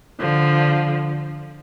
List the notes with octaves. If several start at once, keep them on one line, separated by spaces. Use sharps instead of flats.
D3 F3